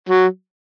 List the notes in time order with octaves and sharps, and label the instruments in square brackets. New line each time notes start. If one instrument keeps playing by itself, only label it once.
[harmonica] F#3